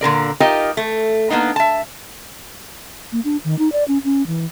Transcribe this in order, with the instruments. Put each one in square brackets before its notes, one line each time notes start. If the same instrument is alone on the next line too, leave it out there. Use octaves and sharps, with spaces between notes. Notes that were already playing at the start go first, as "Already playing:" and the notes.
[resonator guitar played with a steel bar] A#2 D3 A#4 D5
D#4 F4 G4 A#4 D#5
A3
A#3 B3 D4 D#4
E5 A5
[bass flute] A#3
D4
D#3
D#4
D5
C#4
C#4
E3